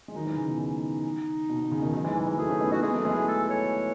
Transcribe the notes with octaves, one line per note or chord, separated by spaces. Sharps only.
G#3
D#3 F#3 D#4
E3 G#3
C#3
B2
C#3 D#4
B2
B2
C#3
B2 D#3
D#3 F#3
E3 G#3
E3 G#3
E3 G#3
F#3 A3 G#4
A3 C#4
B3 D#4
B3 D#4 F#4
G#3 B3 G#4
F#3 A3
E3 G#3
F#3 A3
A4
C#5